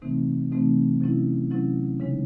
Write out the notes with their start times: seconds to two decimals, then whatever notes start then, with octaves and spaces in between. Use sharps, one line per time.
0.02 C3 E3 A3 C4 D#4
0.51 C3 E3 A3 C4 D#4
1.01 C3 F#3 C#4 E4
1.51 C3 F#3 C#4 E4
2.00 C#3 G#3 D#4